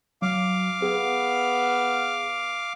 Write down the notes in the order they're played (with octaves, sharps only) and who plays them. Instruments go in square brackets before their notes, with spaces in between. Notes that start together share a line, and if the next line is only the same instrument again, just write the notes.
[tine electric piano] F#3 [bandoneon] F5 D6
[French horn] B3 [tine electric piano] G#4